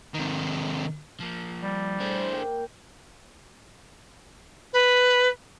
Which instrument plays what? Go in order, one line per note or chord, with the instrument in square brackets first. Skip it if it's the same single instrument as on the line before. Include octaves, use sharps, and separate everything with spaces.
[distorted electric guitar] C3 D#3
[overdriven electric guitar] F3 A#3
[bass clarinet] G3
[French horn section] A2 A3 C5 [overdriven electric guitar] D4 G#4
[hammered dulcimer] A#3 G5
[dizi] B4